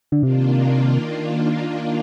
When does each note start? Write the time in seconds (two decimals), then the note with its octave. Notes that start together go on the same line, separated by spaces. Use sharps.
0.12 D3
0.22 C3 D#3 A#3 D4 F4